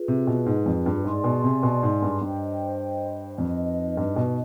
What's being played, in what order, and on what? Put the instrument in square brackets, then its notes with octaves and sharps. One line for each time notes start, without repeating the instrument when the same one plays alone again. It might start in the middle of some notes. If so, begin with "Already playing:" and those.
Already playing: [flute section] F4 G#4 B4
[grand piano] C3
B2
G#2
F2
G2
[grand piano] G#2 [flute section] G#4 D5 G#5 C6
[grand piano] B2
C3
B2
G#2
G2
[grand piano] G2 [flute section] C5 D#5 G5
[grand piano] F2 [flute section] D#4 B4 D#5
[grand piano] G2
B2